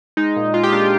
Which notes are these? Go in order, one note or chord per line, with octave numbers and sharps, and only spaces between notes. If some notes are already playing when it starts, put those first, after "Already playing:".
G#3 D#4
A#2
G#3 F4
G4
A#2 D4 F4